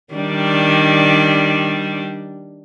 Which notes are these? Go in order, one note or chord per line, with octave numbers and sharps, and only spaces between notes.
D#3 G3 D4